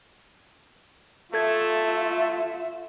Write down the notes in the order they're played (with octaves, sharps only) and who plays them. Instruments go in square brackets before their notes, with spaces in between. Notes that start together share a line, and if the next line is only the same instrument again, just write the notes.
[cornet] A3 [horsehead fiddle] F4 E5 [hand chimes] A4 G#6